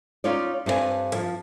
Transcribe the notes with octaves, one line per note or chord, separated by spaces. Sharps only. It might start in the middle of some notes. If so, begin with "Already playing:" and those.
C#4 D#4 F4 C#5 D5
G2 C4 G4 B4 G#5
F3